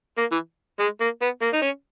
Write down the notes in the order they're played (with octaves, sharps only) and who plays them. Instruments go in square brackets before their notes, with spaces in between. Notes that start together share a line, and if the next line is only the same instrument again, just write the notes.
[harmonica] A#3
E3
G#3
A#3
B3
A#3
D#4
C#4